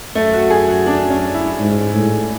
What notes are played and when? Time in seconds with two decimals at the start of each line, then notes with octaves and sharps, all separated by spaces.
0.15 F#2 A3
0.33 F#4
0.50 G#4
0.68 F#4
0.86 D4
1.10 C#4
1.34 E4
1.59 G#2
1.94 A2